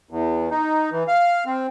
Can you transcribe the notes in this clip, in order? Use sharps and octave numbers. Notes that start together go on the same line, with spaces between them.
E2
D#4
E3
F5
C4